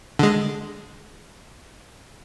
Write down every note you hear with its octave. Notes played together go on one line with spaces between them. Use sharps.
D3 G#3